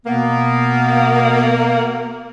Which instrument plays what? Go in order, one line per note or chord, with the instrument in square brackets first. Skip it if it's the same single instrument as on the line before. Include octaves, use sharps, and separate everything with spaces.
[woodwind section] B2 B3 [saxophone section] A#3